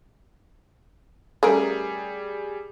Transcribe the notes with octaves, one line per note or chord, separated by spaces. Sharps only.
G3 A3 C#4 G#4 A#4